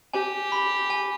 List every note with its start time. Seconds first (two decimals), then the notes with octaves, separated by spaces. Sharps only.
0.13 G4 G#5
0.52 B5
0.90 G#5